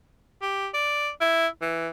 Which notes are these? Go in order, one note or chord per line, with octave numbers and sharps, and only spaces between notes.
G4
D5
E4
E3